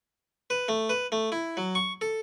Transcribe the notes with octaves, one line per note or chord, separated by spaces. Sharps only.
B4
A3
B4
A3
E4
F#3
C#6
A4